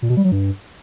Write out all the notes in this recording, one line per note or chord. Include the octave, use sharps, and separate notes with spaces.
A#2
B2
G3
F#3
G2